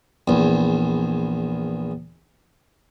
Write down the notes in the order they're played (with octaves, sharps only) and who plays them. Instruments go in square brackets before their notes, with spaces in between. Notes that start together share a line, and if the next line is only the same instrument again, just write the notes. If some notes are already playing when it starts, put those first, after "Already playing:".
[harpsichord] A#1 E2